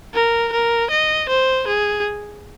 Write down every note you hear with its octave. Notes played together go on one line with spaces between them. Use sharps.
A#4
A#4
D#5
C5
G#4